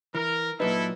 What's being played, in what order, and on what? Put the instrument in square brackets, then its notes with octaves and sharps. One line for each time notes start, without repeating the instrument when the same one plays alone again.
[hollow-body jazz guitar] E3 [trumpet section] A#4
[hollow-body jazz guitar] A#2 F#3 D#4 [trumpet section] E4 A4 [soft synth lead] B4